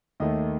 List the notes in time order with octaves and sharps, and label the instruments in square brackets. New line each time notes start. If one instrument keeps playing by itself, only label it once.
[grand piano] D#2 D#3 A3 D#5